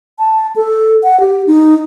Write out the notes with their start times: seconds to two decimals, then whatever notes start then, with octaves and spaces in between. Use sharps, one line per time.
0.19 A5
0.56 A4
1.03 F#5
1.20 G4
1.47 D#4